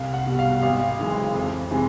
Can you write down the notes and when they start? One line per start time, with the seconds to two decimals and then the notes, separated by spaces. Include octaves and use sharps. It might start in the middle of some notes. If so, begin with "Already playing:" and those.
Already playing: C2 F5
0.14 F#5
0.26 B2 G3
0.39 F5
0.63 G#1 F5
0.99 F#2 C#3 E3 G#3
1.34 F2
1.71 C3 E3 G#3